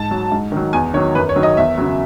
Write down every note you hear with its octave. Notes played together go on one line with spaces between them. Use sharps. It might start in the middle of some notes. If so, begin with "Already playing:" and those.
Already playing: G#2 A5
F#3
G#2
D#3 F#3
E2 G#5
D#3 F#3 C#5
F#2 B4
C#5
D#3 F#3
D#5
E2 E5
C#3 F#3